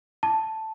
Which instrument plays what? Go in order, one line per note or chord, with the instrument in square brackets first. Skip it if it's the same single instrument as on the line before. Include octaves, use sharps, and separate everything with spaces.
[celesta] A5